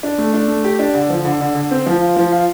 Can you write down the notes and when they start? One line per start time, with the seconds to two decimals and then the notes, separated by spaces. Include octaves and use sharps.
0.03 D4
0.18 A3
0.33 D4
0.48 A3
0.64 G4
0.79 D4
0.94 D3
1.10 F3
1.25 D3
1.41 D3
1.55 D3
1.71 C4
1.86 F3
2.01 F4
2.16 F3
2.32 F4